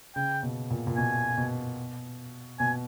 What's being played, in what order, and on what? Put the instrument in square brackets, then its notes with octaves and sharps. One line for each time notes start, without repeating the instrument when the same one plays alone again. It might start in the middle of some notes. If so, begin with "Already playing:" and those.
[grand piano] C#3 [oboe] G5
[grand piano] B2
A#2
A#2
[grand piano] B2 [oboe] G#5
[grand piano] B2
[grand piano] B2 [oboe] G#5